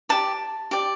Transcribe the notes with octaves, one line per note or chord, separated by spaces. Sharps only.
G4 D5 A5
G4 D5